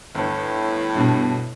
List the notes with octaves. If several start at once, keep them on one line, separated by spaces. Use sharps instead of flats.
G1 A2
G2 B2